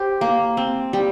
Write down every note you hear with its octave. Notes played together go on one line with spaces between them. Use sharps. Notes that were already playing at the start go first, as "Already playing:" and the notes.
Already playing: G4 C5
A#3
C4
G3